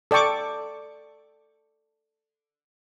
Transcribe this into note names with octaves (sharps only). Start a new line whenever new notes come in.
A4 D5 G5 C#6 D6